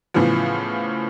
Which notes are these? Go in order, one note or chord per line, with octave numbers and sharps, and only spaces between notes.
A2 C#3 E3 F3 B3